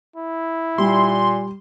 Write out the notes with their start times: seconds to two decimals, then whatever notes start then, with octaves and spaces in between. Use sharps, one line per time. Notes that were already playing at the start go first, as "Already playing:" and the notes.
0.16 E4
0.78 A#2 G3 C6